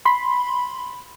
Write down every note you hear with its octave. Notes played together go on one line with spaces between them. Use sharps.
B5 C6